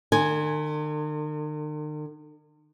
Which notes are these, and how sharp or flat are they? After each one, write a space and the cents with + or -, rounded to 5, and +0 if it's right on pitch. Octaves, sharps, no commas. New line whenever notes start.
D#3 -45 G#5 +0